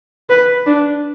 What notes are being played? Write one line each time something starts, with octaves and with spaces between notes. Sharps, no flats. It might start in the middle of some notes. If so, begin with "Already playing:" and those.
B4
D4